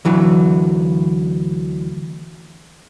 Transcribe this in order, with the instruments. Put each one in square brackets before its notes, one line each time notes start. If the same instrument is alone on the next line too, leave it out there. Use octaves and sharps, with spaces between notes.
[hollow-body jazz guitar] D2 E3 F#3